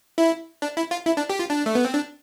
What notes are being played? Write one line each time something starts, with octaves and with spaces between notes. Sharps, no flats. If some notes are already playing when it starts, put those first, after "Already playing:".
E4
D4
E4
F4
E4
D4
G4
F4
D4
A3
B3
C4
D4